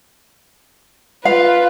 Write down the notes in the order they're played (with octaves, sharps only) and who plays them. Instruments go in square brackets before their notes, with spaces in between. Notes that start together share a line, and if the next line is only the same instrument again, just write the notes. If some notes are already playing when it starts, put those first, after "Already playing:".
[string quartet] F4 B4 [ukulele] F5